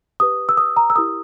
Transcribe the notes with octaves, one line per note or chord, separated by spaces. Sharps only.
G4 B4 D#6
E6
D#6
A#5
E6
E4 G4 A#4 D#6